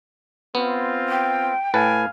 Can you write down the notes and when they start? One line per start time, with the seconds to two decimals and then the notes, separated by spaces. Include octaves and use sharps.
0.55 B3 C4 F4
1.08 G5
1.74 A2 B4 F5 G#5 A5